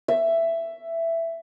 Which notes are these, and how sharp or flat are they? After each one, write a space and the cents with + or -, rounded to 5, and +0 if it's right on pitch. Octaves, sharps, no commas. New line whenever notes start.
E5 +10